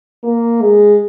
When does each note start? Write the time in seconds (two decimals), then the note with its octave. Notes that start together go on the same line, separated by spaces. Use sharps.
0.23 A#3
0.62 G#3